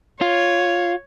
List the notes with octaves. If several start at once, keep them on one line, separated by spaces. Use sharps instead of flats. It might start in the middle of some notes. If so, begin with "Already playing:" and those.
F4 C#5